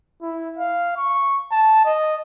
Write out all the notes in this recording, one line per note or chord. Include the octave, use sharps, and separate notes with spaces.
E4
F5
C#6
A5
D#5